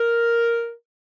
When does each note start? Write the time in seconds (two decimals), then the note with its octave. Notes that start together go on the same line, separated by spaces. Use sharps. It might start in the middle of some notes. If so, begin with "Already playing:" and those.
Already playing: A#4